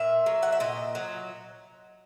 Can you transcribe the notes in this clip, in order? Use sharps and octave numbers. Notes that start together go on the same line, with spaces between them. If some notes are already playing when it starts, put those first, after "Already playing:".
Already playing: A#2 E5
F#3
F#5
E5
A#2 D#5
F#3